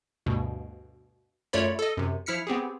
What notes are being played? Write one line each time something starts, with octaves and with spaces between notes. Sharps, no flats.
D2 G2 B2
F#2 A3 F4 C#5 D5 B5
A4 D#5
F#2 C3
F3 E4 F6 B6 C#7
B3 C4 G4 G#4